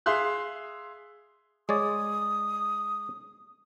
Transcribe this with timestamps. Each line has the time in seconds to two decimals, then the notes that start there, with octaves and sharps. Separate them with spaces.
0.06 G#4 E5 F5 C6 F#6
1.69 G#3 C#5 D5 D#6